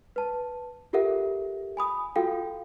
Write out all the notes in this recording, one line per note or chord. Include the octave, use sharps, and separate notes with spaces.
B4 A5
F4 G4 A4 A#4 E5 F#5
G#5 B5 D#6
F4 F#4 A4 F5 G5